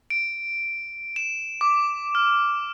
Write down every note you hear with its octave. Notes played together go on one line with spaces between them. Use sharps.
D7
E7
D6
F6